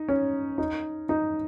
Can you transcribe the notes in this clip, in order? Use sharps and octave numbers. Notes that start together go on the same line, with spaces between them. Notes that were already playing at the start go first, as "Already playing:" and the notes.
Already playing: D#4
C#4
D#4
D#4